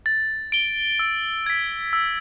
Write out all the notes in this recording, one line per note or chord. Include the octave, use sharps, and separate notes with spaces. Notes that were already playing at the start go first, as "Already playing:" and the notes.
A6
D7 G7
E6
G#6 B6
E6